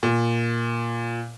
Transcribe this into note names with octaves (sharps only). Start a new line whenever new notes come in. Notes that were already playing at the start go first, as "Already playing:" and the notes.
A#2